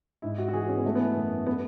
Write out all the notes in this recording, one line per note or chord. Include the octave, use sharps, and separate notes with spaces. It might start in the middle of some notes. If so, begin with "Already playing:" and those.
G#2 E4
F#4
F#4
E3 G#4
C#4
B3
E3 A3
B3
F#2
B3